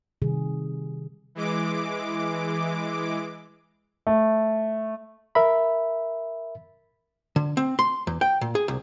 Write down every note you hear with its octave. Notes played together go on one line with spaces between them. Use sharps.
C3 D#3 G3 G#4
E3 G#3 D6
A3
A#4 E5 B5
D3
C4
C6
E2
G5
A#2
G#4
C2